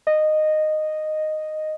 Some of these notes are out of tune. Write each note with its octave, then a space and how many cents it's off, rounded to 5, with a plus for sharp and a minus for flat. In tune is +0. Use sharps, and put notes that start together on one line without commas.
D#5 -10